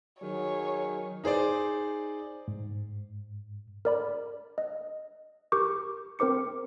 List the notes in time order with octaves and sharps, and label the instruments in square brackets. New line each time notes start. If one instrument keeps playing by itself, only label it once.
[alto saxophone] D#3 [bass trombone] F#3 [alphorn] G#4 [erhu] C#5
[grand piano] D#4 G#4 C5 D5
[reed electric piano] G#2
[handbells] A#4 D5 B5
D#5
G4 A#4 C#6 D6 G6
C4 A#4 C5 D6 C#7